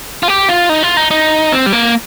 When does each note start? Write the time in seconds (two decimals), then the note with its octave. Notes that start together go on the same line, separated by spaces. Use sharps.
0.23 F4
0.28 G4
0.49 F4
0.69 D#4
0.83 F4
0.97 D#4
1.11 D#4
1.52 C4
1.66 G3
1.73 A#3